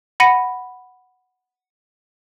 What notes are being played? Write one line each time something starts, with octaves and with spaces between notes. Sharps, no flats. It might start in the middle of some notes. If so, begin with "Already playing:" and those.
F#5 B5 A#6 C#7 D#7